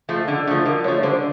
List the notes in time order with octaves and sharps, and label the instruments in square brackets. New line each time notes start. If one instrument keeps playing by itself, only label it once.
[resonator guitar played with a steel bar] F3 A3
D3
F3 A3
[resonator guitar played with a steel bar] D3 [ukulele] A#4
[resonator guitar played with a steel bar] F3 [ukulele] C#5
[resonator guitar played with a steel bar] A3
[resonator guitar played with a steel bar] D3 [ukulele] C5